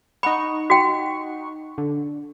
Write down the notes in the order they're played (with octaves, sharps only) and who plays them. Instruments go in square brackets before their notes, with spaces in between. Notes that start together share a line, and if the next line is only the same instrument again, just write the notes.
[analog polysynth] D#4 F#5 C#6 [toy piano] B5
[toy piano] F#4 G5
[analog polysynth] D3